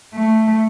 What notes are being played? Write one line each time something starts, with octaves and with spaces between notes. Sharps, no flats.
A3